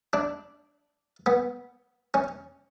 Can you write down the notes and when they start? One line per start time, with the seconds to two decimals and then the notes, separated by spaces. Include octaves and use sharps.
0.13 D4
1.26 B3
2.14 C#4